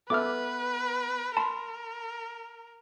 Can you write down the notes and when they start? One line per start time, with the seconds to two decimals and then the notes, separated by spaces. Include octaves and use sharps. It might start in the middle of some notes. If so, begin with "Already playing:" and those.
0.10 B3 A4 B4 E5 D6 F6
1.37 A#4 A5 B5 C6